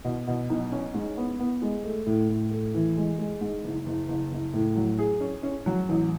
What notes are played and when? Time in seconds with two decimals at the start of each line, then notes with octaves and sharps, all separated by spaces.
0.05 B2
0.27 B2
0.50 B1
0.72 C#4
0.94 G#2
1.17 B3
1.39 B3
1.62 G#3
1.84 A3
2.06 A2
2.29 A2
2.51 A3
2.74 E3
2.97 G#3
3.19 G#3
3.41 G#2
3.64 F#1
3.86 F#1
4.08 F#1
4.32 F#1
4.53 A2
4.76 F#3
4.99 G#4
5.20 C#4
5.43 C#4
5.66 F#3
5.89 A1